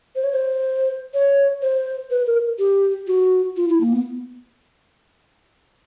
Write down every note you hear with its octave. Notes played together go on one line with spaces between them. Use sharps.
C5
C#5
C5
C#5
C5
B4
A#4
G4
F#4
F4
E4
A#3
B3